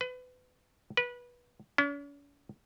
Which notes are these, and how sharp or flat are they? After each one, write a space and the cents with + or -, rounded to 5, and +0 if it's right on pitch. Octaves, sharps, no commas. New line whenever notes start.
B4 +30
B4 -20
C#4 +45